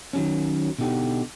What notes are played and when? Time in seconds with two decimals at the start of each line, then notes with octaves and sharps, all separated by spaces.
0.13 D#3 F#3 C#4
0.78 B2 D3 D#4 F#4 G4